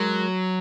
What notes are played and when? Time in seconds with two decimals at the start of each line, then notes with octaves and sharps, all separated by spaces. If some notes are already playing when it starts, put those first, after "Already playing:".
Already playing: F#3 G#3 A#4